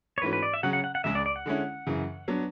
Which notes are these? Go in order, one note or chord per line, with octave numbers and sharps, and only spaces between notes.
C#5
G#2 E3 A3 C#4 F#4 B4
B4
D5
E5
C#3 F#3 C#4 F#5
F#5
F#5
F#5
C#2 C#3 G#3 E5
D5
D5
F#5
D3 G#3 C#4 E4
F#2 C#3 E3
F#3 B3 D4